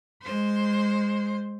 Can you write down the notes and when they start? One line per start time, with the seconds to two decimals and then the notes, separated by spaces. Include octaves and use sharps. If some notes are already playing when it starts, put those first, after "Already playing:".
0.22 G#3 C5